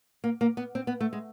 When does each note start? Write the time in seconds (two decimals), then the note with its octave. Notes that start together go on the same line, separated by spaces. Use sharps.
0.24 A#3
0.41 A#3
0.57 B3
0.75 C4
0.87 B3
1.01 A3
1.13 G#3